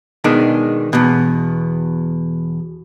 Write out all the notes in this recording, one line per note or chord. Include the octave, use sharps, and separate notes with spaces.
B2 D#3 G#3 D4
E2 B2